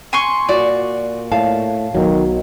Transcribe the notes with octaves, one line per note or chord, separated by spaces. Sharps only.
G#5 C6 C#6
A#2 F#4 D5
A2 F5 A5
B1 B2 D#3 F#3